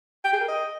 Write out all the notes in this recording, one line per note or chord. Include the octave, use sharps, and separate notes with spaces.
G5
G#4
A#4
D#5